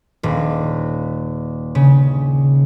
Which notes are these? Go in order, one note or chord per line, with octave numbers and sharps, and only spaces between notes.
D#1
C#3